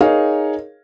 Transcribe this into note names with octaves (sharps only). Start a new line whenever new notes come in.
D#4 G#4 A#4 C#5 F5